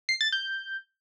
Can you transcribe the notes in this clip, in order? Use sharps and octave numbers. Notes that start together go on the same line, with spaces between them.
C7
A6
G6